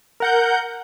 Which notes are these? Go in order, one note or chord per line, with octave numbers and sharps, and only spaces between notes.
A#4 F#5 G6